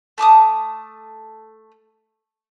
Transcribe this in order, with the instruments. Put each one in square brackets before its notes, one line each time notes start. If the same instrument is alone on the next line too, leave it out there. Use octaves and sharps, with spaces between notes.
[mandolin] A3 A5 D6 D#6